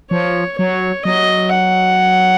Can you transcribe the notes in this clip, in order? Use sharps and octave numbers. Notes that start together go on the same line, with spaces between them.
F3 C#5
F#3 C#5
F#3 D#5
F#5